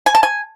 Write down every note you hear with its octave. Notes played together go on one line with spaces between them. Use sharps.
G#5
A5
G#5